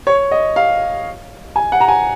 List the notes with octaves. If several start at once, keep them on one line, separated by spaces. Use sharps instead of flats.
C#5
D#5
F5
G#5
F#5
A#5
G#5